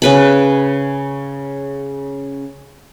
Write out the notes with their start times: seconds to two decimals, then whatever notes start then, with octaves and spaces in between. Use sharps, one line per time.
0.02 C#3 B4 B5